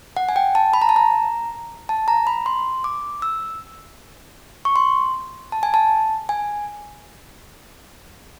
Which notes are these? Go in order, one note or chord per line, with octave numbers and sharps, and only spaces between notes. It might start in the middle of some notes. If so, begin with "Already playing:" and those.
F#5
G#5
G5
A5
B5
A#5
A5
A#5
A5
A#5
B5
C6
D6
E6
C#6
C6
A5
G#5
A5
G#5